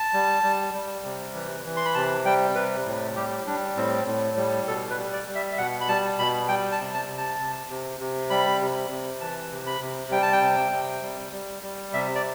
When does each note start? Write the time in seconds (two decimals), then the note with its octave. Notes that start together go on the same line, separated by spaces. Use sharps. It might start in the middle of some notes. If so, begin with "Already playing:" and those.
Already playing: A5
0.13 G3
0.43 G3
0.74 G3
1.05 C3
1.35 E3
1.65 E3
1.76 C6
1.85 B5
1.95 C3 A5
2.25 G3 G5
2.55 C3 B4
2.86 A2
3.16 G3 G4
3.47 G3 D4
3.76 A2 C4
4.06 A2
4.37 G3
4.67 B2 A4
4.90 B4
4.97 G3
5.13 D5
5.28 G3
5.35 E5
5.52 E5
5.58 B2 F#5
5.81 B5
5.88 G3 A5
6.19 B2 B5
6.48 G3 G5
6.72 A5
6.79 C3
6.94 A5
7.09 C3
7.17 A5
7.40 C3
7.70 C3
8.00 C3
8.30 G3 B5
8.61 C3
8.91 C3
9.21 E3 A5
9.51 C3
9.67 B5
9.81 C3
10.11 G3 G5
10.22 A5
10.32 G5
10.42 C3
10.72 C3
11.02 G3
11.33 G3
11.63 G3
11.93 C3 E5
12.15 D5